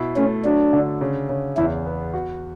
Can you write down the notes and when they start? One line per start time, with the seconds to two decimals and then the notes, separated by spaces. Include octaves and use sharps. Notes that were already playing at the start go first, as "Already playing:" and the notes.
Already playing: B2 E4
0.17 A3 C#4
0.45 F#3 D4
0.73 D3
1.01 C#3
1.29 C#3
1.57 E2 E4
1.86 B3
2.13 F#4